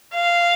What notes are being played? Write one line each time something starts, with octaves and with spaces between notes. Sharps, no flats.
F5